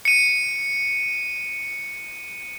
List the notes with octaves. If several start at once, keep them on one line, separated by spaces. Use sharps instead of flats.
C#7 D#7